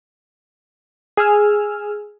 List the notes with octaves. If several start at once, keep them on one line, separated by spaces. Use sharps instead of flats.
G#4 G#5 E6 F6